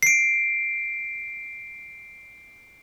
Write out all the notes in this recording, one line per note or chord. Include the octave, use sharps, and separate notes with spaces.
C7 D7